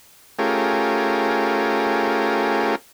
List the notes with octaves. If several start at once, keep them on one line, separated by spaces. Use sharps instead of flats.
A3 C#4 F4 G4 G#4 A#4